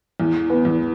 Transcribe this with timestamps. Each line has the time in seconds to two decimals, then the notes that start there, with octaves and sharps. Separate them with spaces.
0.20 E2
0.50 B3 B4
0.65 E2